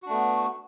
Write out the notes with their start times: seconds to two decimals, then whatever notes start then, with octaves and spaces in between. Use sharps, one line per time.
0.03 F#4
0.06 D4
0.09 A3
0.12 B3